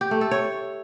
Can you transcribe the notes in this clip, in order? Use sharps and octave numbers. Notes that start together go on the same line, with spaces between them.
G4
A3
A4
C#5